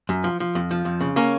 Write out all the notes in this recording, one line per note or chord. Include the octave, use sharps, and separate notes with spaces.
F#2
F3
F3
F2
F3
F2
C#3
A#3 C#4